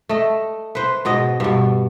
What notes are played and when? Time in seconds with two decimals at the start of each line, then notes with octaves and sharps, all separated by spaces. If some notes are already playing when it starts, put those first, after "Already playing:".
0.09 A3 D#5
0.75 B4 C5
1.05 G#2 B2 D#5
1.40 G2 B2